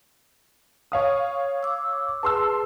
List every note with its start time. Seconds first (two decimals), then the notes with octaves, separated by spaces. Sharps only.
0.92 C#5 F5 D#6
1.63 D6 E6
2.23 G#4 B4 A5 C6 E6